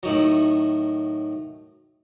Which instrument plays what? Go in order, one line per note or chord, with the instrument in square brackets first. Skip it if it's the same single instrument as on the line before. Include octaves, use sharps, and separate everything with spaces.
[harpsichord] A2 D#3 F#3